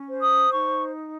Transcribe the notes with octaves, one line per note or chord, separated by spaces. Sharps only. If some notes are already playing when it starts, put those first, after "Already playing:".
Already playing: C#4
C5
D#6
D#4 C#6